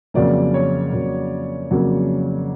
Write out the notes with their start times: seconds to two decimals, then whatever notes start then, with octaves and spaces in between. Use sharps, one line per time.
0.14 F2 C#3 F#3 A#3 D5
0.54 C#5
0.93 F2 C#3 F#3 A#3
1.71 F2 C#3 F#3 A#3